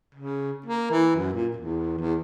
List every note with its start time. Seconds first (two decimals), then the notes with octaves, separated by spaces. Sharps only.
0.15 C#3
0.66 A#3
0.91 E3
1.16 F#2
1.33 A#2
1.56 E2
1.99 E2